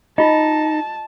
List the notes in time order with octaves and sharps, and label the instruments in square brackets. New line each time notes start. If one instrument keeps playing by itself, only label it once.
[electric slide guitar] D#4 [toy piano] F4 D#5 [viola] A5